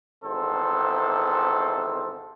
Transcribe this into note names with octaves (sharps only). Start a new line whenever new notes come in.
G#1 E2 C3 A4 C5